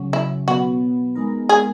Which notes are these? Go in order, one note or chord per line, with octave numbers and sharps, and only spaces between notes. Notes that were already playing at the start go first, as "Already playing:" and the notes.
Already playing: C#3 F#3 C#4
E4
B2 F#3 B3 F#4
G#3 B3 D#4 A#4
G#4